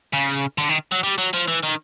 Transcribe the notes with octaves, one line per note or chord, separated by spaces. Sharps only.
C#3
D3
D#3
F#3
G3
F#3
F3
E3
D#3